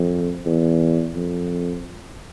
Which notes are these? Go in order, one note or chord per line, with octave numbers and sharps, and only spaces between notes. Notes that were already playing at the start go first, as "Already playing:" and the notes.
Already playing: F2
E2
F2